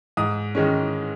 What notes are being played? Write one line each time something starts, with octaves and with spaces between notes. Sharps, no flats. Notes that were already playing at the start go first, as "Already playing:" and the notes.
G#2 D#6
D#3 G#3 C#4